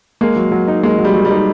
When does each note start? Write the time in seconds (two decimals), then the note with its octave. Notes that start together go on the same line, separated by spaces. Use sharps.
0.21 G#3 A#3
0.36 F#3
0.52 F#3
0.68 D#4
0.83 G#3 A#3
0.99 F#3
1.05 G3
1.15 F#3
1.25 G3
1.30 D#4